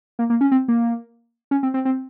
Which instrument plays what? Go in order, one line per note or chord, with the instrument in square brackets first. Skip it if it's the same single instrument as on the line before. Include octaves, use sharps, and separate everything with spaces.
[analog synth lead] A#3
A#3
C#4
C4
A#3
C#4
C4
C4
C4